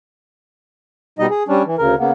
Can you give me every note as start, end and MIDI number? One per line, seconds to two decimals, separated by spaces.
1.19 1.26 47
1.19 1.26 55
1.19 1.26 63
1.19 1.26 75
1.30 1.43 68
1.48 1.63 55
1.48 1.63 61
1.48 1.63 62
1.66 1.76 52
1.78 1.95 38
1.78 1.95 49
1.78 1.95 70
1.99 2.12 49
1.99 2.12 58
1.99 2.12 59